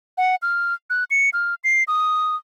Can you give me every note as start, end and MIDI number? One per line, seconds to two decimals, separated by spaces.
0.18 0.35 78
0.42 0.74 89
0.90 1.04 90
1.11 1.30 97
1.33 1.54 89
1.64 1.83 96
1.88 2.36 87